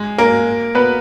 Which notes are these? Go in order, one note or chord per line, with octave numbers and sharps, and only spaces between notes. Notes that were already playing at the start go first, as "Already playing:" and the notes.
Already playing: G#3
A#3 A#4
B3 B4